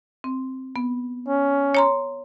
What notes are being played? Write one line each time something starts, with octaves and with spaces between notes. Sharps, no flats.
C4
B3
C#4
C#5 A#5 C6